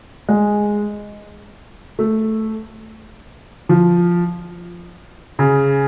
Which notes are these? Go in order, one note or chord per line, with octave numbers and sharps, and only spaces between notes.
G#3
A3
F3
C#3